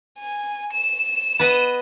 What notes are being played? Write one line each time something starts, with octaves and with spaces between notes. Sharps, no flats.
G#5
E7
B3 B4 D#5